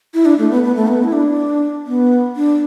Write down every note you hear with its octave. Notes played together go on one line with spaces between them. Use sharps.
E4
D4
A3
B3
B3
A3
B3
E4
D4
B3
D4